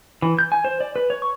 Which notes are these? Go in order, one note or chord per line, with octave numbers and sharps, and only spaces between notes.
E3
G6
G#5
C5
D5
B4
C#5
C#6